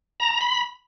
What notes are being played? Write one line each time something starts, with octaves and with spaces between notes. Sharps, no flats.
A#5
A#5
B5